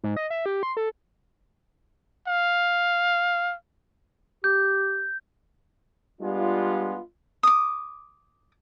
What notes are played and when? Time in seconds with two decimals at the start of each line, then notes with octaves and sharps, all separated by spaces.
0.04 G#2
0.16 D#5
0.30 E5
0.46 G4
0.63 C6
0.77 A4
2.27 F5
4.44 G4 G6
6.21 G3 G#3 B3 D4 F4
7.43 D6 D#6